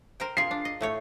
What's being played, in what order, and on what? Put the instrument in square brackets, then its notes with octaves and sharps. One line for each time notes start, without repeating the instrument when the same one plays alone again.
[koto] A#4 C5 G5
[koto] F4 G#4 [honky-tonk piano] C7
[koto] D4
D#5
A2 A3 C#5